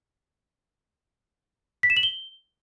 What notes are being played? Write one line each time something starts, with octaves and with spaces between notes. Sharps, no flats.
B6
E7
F#7
G7